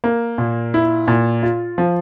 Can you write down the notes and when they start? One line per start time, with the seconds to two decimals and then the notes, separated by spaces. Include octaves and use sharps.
0.04 A#3
0.38 A#2
0.74 E4
1.08 A#2
1.43 F4
1.78 F3